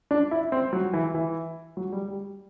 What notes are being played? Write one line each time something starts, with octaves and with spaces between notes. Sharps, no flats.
D4
E4
C4
F#3
E3
E3
F#3
G3
G3